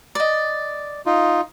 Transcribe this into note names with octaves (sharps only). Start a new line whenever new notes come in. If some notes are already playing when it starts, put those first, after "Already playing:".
D5 D#5
D#4 F4